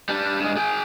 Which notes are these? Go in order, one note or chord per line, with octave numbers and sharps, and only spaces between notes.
G3 D4
G2 G#3
G#4 G5